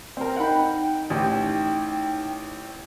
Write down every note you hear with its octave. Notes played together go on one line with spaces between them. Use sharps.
C4 A#4
D#4 F#5 G5 B5
A1 G4